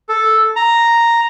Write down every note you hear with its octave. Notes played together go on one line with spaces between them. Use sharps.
A4
A#5